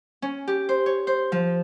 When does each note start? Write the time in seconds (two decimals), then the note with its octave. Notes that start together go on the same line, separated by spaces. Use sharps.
0.22 C#4
0.48 G4
0.69 C5
0.86 C#5
1.07 C5
1.32 F3